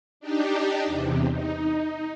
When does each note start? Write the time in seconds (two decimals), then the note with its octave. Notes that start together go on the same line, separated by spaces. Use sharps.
0.20 D4 D#4 G4
0.86 E2 C3
1.32 D#4